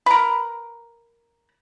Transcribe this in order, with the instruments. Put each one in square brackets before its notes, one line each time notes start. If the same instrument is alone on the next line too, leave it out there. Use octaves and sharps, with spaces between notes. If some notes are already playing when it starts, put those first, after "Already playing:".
[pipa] A#4 B4